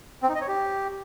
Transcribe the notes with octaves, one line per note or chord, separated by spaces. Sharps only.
C4
D#4
D#5
C#5
G4